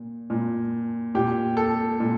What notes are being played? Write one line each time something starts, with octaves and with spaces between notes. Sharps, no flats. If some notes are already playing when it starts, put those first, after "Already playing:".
Already playing: A#2
A#2
A#2 G4
A4
A#2